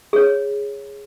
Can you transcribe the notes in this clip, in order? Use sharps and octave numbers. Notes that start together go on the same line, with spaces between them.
G#4 C#5